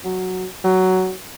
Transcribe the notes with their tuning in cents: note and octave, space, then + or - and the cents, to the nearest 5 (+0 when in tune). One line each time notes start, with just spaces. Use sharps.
F#3 +0
F#3 +10